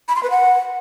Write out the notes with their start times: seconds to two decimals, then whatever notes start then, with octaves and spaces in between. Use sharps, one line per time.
0.08 B5
0.16 C6
0.23 B4
0.30 F#5